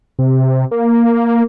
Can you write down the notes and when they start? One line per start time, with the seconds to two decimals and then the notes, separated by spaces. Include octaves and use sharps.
0.19 C3
0.71 A#3